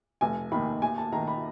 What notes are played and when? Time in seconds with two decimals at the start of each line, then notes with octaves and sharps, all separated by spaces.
0.21 F1 G#5
0.52 D#2 D#3 B5
0.82 D#2 G#5
0.98 A5
1.12 D#3 A#5
1.27 B5